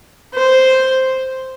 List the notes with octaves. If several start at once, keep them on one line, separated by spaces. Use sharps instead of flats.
C5